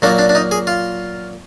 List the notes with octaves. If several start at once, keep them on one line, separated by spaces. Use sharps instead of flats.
A#2 F#3 A#3 D4
D4
D4
D#4
G#4
F4